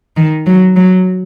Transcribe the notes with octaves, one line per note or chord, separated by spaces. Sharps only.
D#3
F#3
F#3